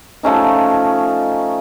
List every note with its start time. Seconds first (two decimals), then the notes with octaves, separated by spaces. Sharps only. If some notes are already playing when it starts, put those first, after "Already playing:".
0.23 F3 A3 C#4 D#4